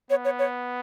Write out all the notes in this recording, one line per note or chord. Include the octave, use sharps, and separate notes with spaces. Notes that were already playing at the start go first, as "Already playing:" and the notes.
B3 C#5
C#5
C#5